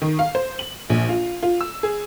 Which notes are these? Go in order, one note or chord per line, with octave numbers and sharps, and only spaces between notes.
D#3
F5
C5
F#7
A#1
F4
F4
E6
G#4